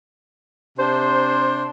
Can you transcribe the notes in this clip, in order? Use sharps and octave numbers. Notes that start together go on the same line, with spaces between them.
C3 D4 C5